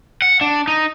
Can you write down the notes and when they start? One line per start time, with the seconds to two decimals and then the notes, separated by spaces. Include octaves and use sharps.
0.22 F#5
0.41 D4
0.68 D#4